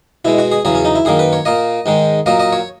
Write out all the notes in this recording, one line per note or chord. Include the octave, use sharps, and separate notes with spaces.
B2 G#3 E4
F#4
G#4
E2 C#3 F#3 G#4
C#4
D#4
E4
F#2 D#3 A#3 G#4
B4
C#5
A#2 A#3 D#5
G#2 D#3 G#3
A#2 F#3 A#3 D#5
D#5
C#5